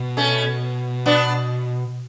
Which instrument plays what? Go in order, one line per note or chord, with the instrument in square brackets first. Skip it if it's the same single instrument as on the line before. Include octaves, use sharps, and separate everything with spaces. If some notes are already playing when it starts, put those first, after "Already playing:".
Already playing: [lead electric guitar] B2
[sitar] A3 C#4
B3 D4